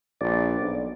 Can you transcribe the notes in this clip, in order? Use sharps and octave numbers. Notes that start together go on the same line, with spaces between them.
A#1 D5
B1